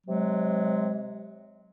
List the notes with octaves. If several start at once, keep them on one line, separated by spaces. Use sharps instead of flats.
C3 F#3 G#3